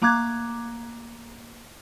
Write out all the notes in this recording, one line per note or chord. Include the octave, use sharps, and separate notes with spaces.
A3 A#3 A#5 D6 F#6 G#6